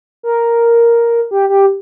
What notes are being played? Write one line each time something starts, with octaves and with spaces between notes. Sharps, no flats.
A#4
G4
G4